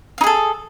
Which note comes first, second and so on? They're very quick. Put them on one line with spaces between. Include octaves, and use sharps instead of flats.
F5 D#4 G#4 A4